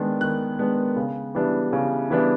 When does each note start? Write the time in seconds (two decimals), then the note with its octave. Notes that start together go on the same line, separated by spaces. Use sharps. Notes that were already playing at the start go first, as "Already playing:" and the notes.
Already playing: D#3 G#3 B3 D4
0.21 D#3 F#6
0.59 G#3 B3 D4
0.96 C#3
1.35 E3 G3 B3 D4
1.73 C#3
2.10 E3 G3 B3 D4